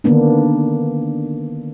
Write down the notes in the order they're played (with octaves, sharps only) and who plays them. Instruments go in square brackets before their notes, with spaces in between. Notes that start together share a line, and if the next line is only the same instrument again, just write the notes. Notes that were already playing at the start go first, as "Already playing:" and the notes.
[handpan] D3 D#3 A#3 B3 D4